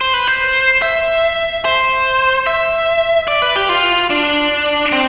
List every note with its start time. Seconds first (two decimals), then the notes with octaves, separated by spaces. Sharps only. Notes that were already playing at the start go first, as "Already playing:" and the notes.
0.01 C5
0.14 B4
0.28 C5
0.82 E5
1.65 C5
2.47 E5
3.28 D5
3.42 B4
3.56 G4
3.69 F4
4.10 D4
4.92 C4